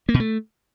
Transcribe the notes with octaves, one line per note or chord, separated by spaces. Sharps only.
A#3
B2
A3